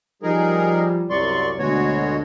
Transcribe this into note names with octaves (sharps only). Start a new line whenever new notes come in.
F3 G3 D#4 G#4 A#4
C2 F#2 D5 C6 C#6
D2 B2 G#3 F#4 C#5